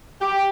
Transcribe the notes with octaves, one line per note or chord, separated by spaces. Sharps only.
G4